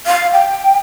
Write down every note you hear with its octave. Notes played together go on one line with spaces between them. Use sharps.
F5
G5